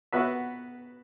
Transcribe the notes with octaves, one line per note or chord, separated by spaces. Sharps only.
B3 F#4 B4 E5